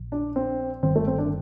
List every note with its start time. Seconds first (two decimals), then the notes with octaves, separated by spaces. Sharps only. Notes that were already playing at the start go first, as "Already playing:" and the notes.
Already playing: A#1
0.12 D4
0.36 C4
0.83 G1 G2 D#3 C4
0.96 A3
1.07 C4
1.18 D4